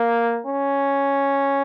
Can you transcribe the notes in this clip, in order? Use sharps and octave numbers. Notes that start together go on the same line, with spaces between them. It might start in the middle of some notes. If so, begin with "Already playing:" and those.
Already playing: A#3
C#4